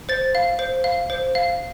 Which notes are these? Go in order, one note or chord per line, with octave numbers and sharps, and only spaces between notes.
C5 A6
F5
C5
F5
C5
F5